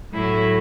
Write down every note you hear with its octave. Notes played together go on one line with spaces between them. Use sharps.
A2 F#3 A3 E4